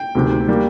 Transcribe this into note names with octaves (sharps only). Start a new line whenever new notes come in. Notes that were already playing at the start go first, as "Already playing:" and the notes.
Already playing: G5
D2 C3 D#3
G3 A#3